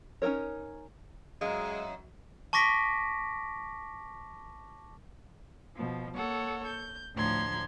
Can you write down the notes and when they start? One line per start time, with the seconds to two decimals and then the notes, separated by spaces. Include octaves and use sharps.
0.22 C#4 D#4 A4 A#4 C#5
1.41 F#2 G#3 D#5 F5 D#6
2.53 A5 C#6 D6 A#6 B6 D7
5.75 B2 F3
6.15 A#3 A4 C#5 F#5
6.66 G6
7.15 D2 A2 F3 A#5 C6 G#6